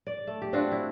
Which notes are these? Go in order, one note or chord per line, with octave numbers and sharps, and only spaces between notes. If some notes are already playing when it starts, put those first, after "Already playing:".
D5
A3
G4
C4 D4 F4 F#4
E4